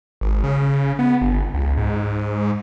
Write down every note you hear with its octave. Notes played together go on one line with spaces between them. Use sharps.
G#1
C#3
B3
G1
C#2
G#2